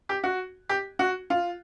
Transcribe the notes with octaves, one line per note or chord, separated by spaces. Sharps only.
G4
F#4
G4
F#4
F4